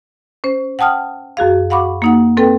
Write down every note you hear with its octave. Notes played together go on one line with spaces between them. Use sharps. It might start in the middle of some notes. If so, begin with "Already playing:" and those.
C#4 C5
F#5 G5 A5 D#6 F6
F#2 F#4 G#4 F5
F5 F#5 B5 C#6 D6
A#3 D#4 F#5
C4 A4 B4 G5